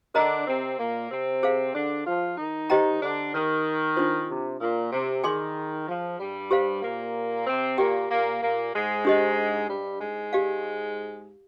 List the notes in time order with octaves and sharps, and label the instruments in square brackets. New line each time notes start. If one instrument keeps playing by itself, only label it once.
[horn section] D3 D4 [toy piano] A#4 D#5 A#5
[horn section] C3 C4
A#2 A#3
C3 C4
[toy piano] G#4 C5 F5
[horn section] D3 D4
F3 F4
D#3 D#4
[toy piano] G4 C5 D#5 G5 A#5
[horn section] D3 D4
D#3
[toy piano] D4 F4 C5
[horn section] C3
A#2
C3
[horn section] D#3 [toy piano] G#4 D5 G#5 C6
[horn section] F3
G2 G3
[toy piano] G4 C5 F5
[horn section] A#2 A#3
C3 C4
[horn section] A#2 A#3 [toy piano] G4 D5 G5
[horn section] A#2 A#3
A#2 A#3
G#2 G#3
[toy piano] D4 G4 C5 D#5
[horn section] G2 G3
G#2 G#3
[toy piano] G4 D5 F5